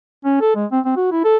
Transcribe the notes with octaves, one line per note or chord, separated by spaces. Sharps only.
C#4
A4
G#3
C4
C4
F#4
E4
A4